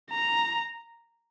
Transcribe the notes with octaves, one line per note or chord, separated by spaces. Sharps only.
A#5